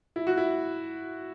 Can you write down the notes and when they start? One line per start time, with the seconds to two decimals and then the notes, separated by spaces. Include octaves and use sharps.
0.16 E4
0.27 F#4
0.37 E4